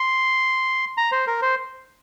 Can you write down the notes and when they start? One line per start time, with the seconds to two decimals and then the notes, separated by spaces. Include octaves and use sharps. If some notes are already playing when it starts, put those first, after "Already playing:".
Already playing: C6
0.97 A#5
1.12 C5
1.27 A#4
1.42 C5